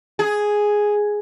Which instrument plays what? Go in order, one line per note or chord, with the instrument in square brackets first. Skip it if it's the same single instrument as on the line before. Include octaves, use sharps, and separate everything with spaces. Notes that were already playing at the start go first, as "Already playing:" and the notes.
[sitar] G#4